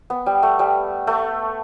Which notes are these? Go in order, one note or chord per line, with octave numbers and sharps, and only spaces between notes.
B3
G3
A3
G3
A3